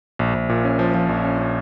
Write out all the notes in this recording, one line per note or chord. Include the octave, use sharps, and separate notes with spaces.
A#1
A#1
A#2
C#4
F3
F3
A#1
C#4
C#4